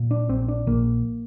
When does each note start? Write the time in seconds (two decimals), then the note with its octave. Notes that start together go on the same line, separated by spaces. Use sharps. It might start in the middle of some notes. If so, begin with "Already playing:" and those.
Already playing: A#2
0.11 D4
0.29 A#1 C4
0.48 D4
0.67 A#1 A#3